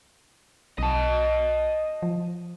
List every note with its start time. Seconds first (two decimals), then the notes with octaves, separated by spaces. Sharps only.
0.78 B1 D#5 A5
2.02 F3